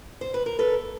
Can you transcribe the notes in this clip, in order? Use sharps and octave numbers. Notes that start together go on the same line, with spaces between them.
C5
B4
A#4
A4 B4